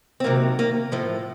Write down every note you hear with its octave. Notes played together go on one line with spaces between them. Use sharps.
C4
C3 D#3 F#3 A#3
A#3
A2 F3 A3